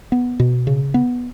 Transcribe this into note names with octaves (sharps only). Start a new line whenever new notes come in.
B3
B2
C#3
B3